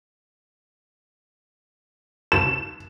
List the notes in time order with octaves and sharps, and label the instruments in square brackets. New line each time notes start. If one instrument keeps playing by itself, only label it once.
[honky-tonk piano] E7